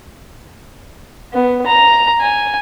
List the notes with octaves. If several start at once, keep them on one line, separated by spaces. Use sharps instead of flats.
B3
A#5
G#5